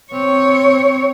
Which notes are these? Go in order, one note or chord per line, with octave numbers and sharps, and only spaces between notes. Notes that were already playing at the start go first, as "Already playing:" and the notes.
C4 C#5